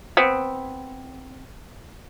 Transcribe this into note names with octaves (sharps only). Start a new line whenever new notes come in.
B3 C4